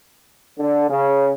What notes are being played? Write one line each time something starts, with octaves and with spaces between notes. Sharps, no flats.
D3
C#3